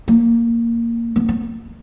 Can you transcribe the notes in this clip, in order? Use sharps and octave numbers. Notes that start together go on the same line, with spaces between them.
A#3
B3
B3